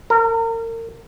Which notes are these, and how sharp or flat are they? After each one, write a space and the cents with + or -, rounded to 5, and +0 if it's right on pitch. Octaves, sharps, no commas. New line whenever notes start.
A#4 -35